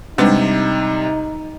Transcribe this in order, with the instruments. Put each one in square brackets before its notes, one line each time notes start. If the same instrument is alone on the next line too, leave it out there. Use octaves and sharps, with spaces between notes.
[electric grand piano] C3 G3 [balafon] G#3 D4 B4 [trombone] D#4